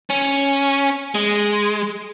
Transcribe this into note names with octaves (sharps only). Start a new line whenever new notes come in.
C#4
G#3